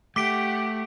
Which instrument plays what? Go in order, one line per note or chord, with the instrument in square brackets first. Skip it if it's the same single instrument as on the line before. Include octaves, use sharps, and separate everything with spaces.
[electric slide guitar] A3 [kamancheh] G4 F#5 [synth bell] D6 B6 D7